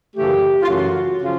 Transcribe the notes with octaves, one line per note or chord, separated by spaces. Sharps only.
F#2 C#3 E3 A3 G4
F4
F#2 C#3 E3 A3 F#4
C#3 F3 F4